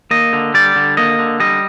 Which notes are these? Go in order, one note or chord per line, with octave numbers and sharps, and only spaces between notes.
A#3 D#5
D3
G3 D5
D3
A#3 D#5
D3
G3 D#5